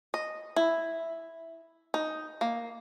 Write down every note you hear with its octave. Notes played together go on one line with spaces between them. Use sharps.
D#5
E4
D#4
A#3